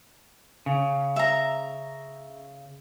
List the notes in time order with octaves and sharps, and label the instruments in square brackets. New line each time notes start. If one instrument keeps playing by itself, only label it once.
[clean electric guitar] C#3
[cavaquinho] E5 A#5